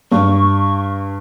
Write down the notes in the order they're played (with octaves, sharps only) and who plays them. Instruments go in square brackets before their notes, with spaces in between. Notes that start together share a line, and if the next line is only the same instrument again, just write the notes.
[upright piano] G2 [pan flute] C#6